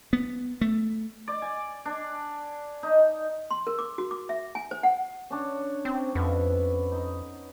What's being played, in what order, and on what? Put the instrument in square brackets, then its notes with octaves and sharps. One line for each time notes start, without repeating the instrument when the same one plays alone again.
[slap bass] B3
A3
[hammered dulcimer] D5
G#5
D4
D#4
[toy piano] C6
A#4
D6
F#4
D6
E5
G#5
C5
F#5
[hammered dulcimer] C#4 D4 C#5
[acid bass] C4
[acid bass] F2 [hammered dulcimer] B3 E5
[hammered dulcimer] D#4